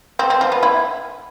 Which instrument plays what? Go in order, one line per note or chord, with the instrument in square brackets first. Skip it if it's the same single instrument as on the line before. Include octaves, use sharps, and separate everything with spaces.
[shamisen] C4
C4
F3
B3
E4